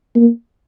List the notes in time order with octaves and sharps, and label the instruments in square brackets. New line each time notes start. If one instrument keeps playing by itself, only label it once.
[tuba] A#3